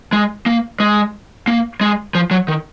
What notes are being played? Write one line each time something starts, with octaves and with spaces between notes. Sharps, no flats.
G#3
A#3
G#3
A#3
G#3
F3
F#3
D#3